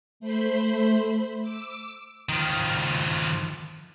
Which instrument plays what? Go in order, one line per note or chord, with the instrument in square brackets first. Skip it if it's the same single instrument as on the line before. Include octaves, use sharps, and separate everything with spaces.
[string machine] A3 C5 B5 C6
D6 E6
[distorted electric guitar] D#3 F3